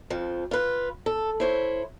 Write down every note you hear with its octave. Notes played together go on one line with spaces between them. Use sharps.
F2 F3
F4 B4
A4
E4 C5 C#5